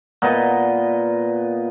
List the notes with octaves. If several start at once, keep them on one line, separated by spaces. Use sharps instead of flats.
A#2 B3 B4 D#5